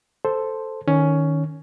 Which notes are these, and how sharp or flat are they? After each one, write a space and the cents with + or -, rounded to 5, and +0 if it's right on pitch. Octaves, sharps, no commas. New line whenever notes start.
A4 +0 C5 +0
D#3 +0 C#4 +10